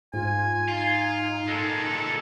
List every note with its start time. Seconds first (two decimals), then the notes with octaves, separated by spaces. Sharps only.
0.14 G#2 F4 G#5
0.68 D#4 F4
1.48 A#2 G#3 A4